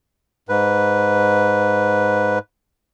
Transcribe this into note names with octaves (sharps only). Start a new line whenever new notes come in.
G#2 B4